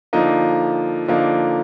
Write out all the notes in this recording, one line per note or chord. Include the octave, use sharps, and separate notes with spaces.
D3 F3 A#3 D#4
D3 F3 A#3 D#4